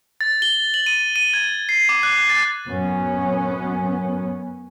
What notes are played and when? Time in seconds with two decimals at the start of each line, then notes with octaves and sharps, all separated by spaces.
0.21 A6
0.42 G7
0.74 F#7
0.86 D#7
1.16 D#7
1.34 G#6
1.69 C7
1.89 D6
2.03 F#6
2.30 A6
2.68 F#2 B3 C#4